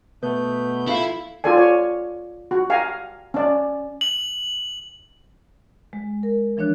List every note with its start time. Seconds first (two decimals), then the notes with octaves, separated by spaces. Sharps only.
0.23 B2 A3 B3 B4 G6
0.87 E4 F4 A4 F5
1.44 F4 G4 A4 D5 G#5
1.57 C#5 D5 G#5
2.51 F#4
2.70 G4 F5 G#5 A#5
3.34 C#4 D5
4.01 F#7
5.93 G#3
6.23 A#4
6.57 E3 F3 D4 C#5 F#6